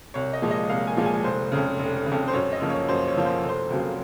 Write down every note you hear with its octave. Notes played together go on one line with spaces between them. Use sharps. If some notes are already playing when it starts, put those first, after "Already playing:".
C2 C#5
D#5
A#2 F3 G#3
D#5
C2 F5
G#5
A#2 F3 G#3
G#5
F1 C5
F2 C#3
F1
C#3
F2
C5
F#2 C#5
D#5
C#3 F3 A#3
C#5
F#2 C5
C#5
C#3 F3 A#3
C5
F1
C5
F2 C#3 F#3 A#3